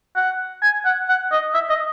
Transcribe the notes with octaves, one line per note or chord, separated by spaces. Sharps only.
F#5
G#5
F#5
F#5
D#5
E5
D#5